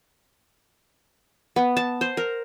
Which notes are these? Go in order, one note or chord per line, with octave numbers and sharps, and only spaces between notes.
B3
A5
C5
A#4